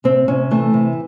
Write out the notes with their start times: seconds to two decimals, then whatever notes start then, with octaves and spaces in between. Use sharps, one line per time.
0.04 C3 C4
0.28 C3 C#4
0.51 E3 A3
0.74 C3